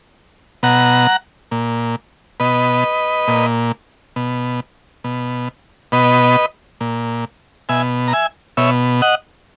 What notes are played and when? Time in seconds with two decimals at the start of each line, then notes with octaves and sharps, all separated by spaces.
0.63 B2 F#5 A#5
1.51 A#2
2.40 B2 B4 D#5
3.28 A#2
4.16 B2
5.04 B2
5.92 B2 B4 D#5
6.81 A#2
7.69 B2 E5 G#5
8.08 A#5
8.13 E5 G#5
8.57 B2 C#5 E5
9.02 D#5 F#5